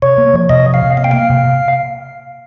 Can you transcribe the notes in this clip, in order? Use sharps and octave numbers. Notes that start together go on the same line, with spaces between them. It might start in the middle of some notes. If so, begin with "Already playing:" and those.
C3 C#5
A#3
F3
C3 D#5
F3
F5
C3
A#3 F5
G5
A#3 F5
C3